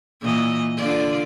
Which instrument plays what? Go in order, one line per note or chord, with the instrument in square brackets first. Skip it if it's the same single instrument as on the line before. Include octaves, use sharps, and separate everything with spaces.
[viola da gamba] A#2 E3 D#5
D3 F4 D5